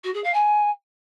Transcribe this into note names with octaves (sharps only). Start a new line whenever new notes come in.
F#4
G#4
F5
G#5